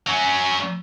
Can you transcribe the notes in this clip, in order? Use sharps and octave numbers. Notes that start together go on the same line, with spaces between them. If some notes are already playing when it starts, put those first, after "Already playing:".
F#3 C#4